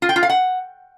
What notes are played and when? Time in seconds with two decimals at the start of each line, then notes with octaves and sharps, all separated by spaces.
0.02 F4
0.09 G5
0.16 F4
0.23 F5
0.29 F#5